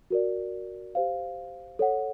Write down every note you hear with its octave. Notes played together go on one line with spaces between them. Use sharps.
F#4 A#4 D5
G4 C5 F5
A4 C#5 F#5